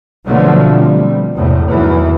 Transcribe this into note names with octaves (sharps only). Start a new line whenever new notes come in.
B2 D3 F3 F#3 A3 C4
G3
E2 A2 C3
E2 D#3 E3 F#3